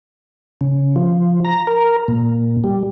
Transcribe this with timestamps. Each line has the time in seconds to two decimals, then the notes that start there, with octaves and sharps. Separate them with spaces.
0.61 C#3
0.96 F3
1.45 A#5
1.67 A#4
2.08 A#2
2.64 G3